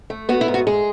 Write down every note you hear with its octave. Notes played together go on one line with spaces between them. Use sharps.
A3
B3 F#4
E4
G#2
F#4
G#3 G#4